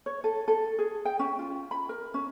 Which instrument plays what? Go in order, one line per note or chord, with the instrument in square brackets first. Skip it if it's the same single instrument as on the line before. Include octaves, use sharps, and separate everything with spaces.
[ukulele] C#5
A4
A4
G#4
G5
C#4
F4
B5
A#4
C#4